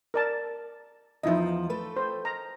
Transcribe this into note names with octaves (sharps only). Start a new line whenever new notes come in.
A#4 D5 A5
E2 F3 D#4 E4 D#5
A3 A4 B4
C5
A#5